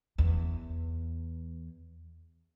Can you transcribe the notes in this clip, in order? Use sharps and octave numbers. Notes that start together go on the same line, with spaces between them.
E2